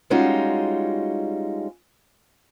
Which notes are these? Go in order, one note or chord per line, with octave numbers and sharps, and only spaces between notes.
G3 G#3 C#4 D#4 F4 F#4